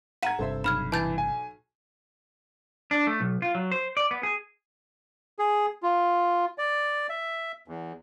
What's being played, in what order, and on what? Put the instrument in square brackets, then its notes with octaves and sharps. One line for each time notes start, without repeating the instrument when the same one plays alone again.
[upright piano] F#5 A#5 G#6 [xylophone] B6 D#7 E7
[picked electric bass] G1 G2 C3 [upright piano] A4 C5 E5
[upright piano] B1 [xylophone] B5 F6 G#6
[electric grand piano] E3 [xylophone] A5 G6 A6
[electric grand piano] G#5
[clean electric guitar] D4
A3
B1
F4
F#3
C5
D5
B3
G#4
[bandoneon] G#4
F4
D5
E5
E2